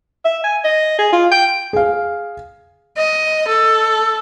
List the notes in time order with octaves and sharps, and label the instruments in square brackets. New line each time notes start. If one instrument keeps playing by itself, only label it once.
[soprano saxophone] E5
G#5
D#5
G#4
F4
G5
[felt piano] G#4 F5
[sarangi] D#5
A4